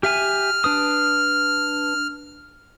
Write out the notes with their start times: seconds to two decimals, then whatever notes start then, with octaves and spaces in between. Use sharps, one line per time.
0.03 G4 E5 G#5 F6
0.64 D4 B4 D#6